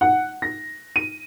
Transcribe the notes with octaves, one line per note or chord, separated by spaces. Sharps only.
F#5
A#6
D#7